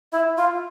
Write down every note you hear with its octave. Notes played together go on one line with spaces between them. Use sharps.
E4 E5
F4 F5